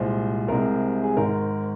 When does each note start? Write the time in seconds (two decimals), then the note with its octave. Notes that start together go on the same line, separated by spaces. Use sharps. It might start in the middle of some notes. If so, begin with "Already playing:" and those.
Already playing: C2 A#2 G#3 C5
0.48 C2 C3 G#3 C4 A#4
1.03 G#4
1.17 G#1 G#2 D#3 A#4